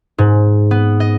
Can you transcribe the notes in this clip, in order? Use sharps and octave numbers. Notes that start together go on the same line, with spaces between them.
G#2
B3
D#5